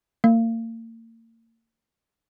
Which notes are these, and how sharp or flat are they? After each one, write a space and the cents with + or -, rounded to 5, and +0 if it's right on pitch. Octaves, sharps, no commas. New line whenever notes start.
A#3 -40